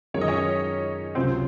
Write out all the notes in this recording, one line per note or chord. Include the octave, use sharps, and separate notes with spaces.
F#2 D#3 G#3 D#4 A#4 C#5
D#5
C#4 C#5
C#2 C3 F#3 C4 C#4 F4 C5